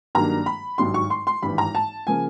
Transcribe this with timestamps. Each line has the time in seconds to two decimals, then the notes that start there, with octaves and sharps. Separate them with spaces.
0.15 G2 D#3 F#3 A#3 D4 A#5
0.46 B5
0.78 G#1 G2 D#3 F#3 C6
0.94 C#6
1.10 C6
1.27 C6
1.43 G#1 G2 E3 B5
1.58 A#5
1.75 A5
2.07 C#3 F3 A#3 G#5